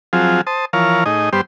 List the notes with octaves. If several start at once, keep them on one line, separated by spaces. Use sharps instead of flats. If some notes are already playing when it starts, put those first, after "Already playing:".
F3 F#3 C4 F4 G#4
C5 A5 D#6
E3 F3 A#4 C#5 F5
A2 D#4 G#4 D#5
G2 G3 B3 G4 C5 C6